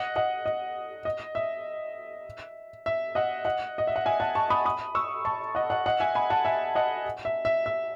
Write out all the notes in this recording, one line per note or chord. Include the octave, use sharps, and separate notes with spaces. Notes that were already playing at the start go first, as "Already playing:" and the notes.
Already playing: D#5 F#5
D#5 F#5
D#5
D#5
E5
E5
D#5 F#5
D#5 F#5
D#5
E5
F#5
E5 G#5
F#5 A5
A5 C#6
B5 D#6
B5 D#6
C#6 E6
A5 C#6
D#5 F#5
D#5 F#5
D#5 F#5
E5 G#5
G#5 B5
F#5 A5
E5 G#5
D#5 F#5
E5
E5
E5